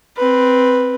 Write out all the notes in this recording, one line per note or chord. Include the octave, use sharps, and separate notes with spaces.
C4 B4